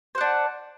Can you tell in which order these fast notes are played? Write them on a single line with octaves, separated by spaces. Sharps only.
C5 F#5 D4